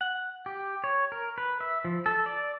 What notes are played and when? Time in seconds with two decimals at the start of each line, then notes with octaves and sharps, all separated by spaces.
0.01 F#5
0.46 G4
0.84 C#5
1.12 A#4
1.38 B4
1.61 E5
1.85 F3
2.06 A4
2.26 D5